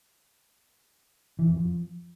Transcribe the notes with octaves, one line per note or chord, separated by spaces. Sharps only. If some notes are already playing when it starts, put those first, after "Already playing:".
E3
F2
F3